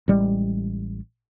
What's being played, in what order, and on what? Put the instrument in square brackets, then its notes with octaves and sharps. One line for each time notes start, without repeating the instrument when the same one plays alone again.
[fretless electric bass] A1 G3 G#3